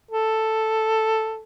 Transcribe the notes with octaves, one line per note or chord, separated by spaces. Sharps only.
A4